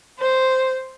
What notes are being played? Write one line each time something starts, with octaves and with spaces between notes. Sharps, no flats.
C5